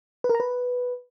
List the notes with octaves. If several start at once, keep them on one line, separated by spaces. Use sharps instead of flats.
B4
A#4
A#5
B4